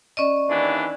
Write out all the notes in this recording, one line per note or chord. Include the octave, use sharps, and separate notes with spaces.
C#4 D5 D#5
D#2 E3 D4